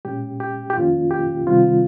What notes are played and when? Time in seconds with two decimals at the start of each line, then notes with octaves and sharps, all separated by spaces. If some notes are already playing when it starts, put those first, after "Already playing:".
0.05 A#2 G#3 C#4 G4
0.40 G4
0.70 G4
0.76 F2 D#3 A#3 C#4 F4
1.11 G4
1.47 C3 D#3 G3 C4 F4